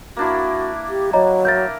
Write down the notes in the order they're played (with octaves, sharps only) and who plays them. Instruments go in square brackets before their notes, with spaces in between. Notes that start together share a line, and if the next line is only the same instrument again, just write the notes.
[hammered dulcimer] A#3 D4 E4 [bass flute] F#4
[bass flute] G4
[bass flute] F#3 [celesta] C#5 D#5 A#5
[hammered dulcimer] A#4 E5 [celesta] G6 A6